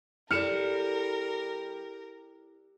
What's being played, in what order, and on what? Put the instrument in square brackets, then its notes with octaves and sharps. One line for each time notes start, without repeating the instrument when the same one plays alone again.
[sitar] G3 [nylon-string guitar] E4 A4 D5 [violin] A#4 [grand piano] F6 C#7 E7